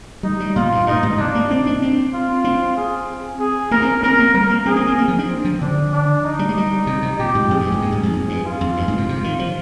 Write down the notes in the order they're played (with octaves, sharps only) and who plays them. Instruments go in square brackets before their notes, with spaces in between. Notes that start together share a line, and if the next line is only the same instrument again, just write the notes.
[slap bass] G3 [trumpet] D#4
[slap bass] G3
[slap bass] A#2 [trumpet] F4
[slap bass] G2
[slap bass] G2 [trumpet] D#4
[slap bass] G#2
[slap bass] C3 [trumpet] D4
[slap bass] A#3
C4
D4
C4
[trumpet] F4
[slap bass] C4
[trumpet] G#4
G#4
[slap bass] A#3 [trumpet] A#4
[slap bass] C4
[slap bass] C4 [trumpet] A#4
[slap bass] A#3
[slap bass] G3 [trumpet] A#4
[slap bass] A#3
[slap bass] C4 [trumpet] G#4
[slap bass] C4
C4
A#3
F3
D4
[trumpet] C4
[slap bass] F3
[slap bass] D3 [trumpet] D4
[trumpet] D4
D#4
[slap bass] G3
G#3
G3
C3
C3
[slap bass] A#2 [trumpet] G4
[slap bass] G#2
[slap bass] F2 [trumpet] G#4
[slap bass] G2
G#2
A#2
G#2
F2
F2
G2
[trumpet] F4
[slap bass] F2
G2
G#2
C3
C3
D#3
F3